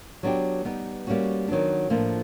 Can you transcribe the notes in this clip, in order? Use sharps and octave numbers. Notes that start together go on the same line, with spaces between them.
F#3 B3 D4 G4
G3 B3 D#4
G3 A#3 C#4 F#4
D#3 F#3 B3 D4
A2 F3 A#3 D4